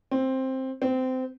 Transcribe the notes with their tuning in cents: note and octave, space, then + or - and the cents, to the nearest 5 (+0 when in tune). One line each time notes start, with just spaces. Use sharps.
C4 +10
C4 -20